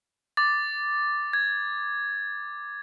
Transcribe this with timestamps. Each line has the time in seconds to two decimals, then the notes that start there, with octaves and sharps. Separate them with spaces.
0.37 D6 A6
1.33 G#6